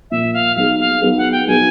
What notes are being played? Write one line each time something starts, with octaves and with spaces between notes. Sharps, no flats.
A#2 F3 A#3 E5
F5
F#3 B3 D#4 G#4 F5
F5
F#3 B3 D#4 G#4
F#5
G5
F#3 B3 D#4 G#4 G#5